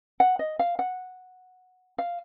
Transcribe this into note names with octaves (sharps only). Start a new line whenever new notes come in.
F#5
D#5
F5
F#5
F5